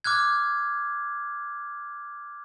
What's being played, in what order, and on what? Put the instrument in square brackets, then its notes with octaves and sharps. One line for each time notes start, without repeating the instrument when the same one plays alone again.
[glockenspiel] D6 F6 F#6 G#6